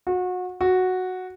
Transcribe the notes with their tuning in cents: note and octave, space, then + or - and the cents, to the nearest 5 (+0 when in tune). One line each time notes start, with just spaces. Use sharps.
F#4 -30
F#4 -5